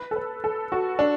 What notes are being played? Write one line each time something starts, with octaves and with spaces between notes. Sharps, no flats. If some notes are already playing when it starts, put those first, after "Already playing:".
Already playing: B4
A4
B4
A4
F#4
D4